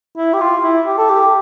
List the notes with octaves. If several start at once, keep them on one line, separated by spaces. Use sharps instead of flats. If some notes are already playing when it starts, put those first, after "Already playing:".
E4
G4
F4
E4
G4
A4
G4